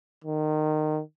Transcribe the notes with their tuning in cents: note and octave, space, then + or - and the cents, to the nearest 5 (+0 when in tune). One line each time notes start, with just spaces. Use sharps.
D#3 -20